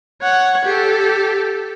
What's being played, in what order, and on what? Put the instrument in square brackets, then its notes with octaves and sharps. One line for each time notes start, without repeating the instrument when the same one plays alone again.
[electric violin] C#5 F#5
G4 A4